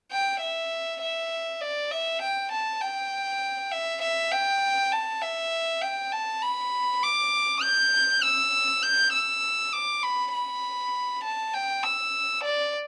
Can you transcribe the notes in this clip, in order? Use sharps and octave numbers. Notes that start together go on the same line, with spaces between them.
G5
E5
E5
D5
E5
G5
A5
G5
E5
E5
G5
A5
E5
G5
A5
B5
D6
G6
E6
G6
E6
D6
B5
B5
A5
G5
E6
D5